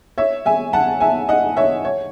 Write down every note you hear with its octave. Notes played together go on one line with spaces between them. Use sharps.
C#5 E5
E5 G#5
F#5 A5
E5 G#5
D#5 F#5
C#5 E5
C#5